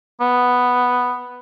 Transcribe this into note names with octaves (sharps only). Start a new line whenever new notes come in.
B3